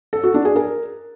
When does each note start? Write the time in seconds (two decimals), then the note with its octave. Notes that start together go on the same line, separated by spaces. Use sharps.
0.13 A4
0.24 F#4
0.34 D4
0.45 G#4
0.56 A#4